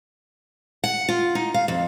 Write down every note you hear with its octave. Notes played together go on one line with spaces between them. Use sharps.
F#5
F4
D#4
F5
F2